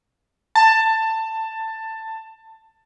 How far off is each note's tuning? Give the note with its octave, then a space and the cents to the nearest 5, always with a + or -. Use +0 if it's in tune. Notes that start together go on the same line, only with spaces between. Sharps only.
A5 +15